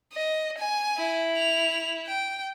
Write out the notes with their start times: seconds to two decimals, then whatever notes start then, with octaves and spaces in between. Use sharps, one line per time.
0.14 D#5
0.58 G#5
0.97 E4
1.37 F7
2.07 G5